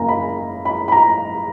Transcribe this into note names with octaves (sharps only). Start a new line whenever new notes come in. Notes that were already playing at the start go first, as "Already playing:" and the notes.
Already playing: F#1 F#2 A#3 G#5 A#5
B5
B5
B5
A#5